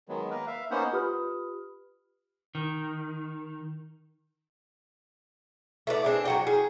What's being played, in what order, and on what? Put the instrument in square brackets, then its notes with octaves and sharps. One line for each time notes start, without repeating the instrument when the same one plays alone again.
[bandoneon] D#3 F#3 G#3 B3
A#3 A#4 B4
E5 F5
A#3 B3 C#4 D#4 C5 F#5
[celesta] F4 G4 B4 B5 D#6 F6
[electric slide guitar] D#3
[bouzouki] A3 B3 D5
C4 D4 G#4
F#3 F#5 G5
G#4